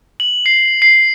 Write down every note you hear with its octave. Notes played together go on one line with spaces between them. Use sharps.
F#7
C7
C7